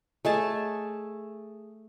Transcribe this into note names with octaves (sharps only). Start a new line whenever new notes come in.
A3 G#4 C#5 D#5 G#5 A5